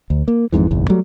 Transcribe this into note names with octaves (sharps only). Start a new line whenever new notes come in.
D2
A#3
G#1 F2 G#2 E3
F#1 B1 E2
F#3 G3 A3